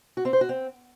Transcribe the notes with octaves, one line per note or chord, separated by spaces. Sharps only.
F#4
C4
C5
F#4
C4